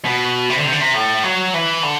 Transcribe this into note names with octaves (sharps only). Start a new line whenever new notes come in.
B2
C3
D3
C3
D3
C3
A2
F#3
E3
D3